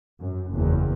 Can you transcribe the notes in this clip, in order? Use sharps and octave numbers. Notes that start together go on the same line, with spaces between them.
F#2
F#1 E2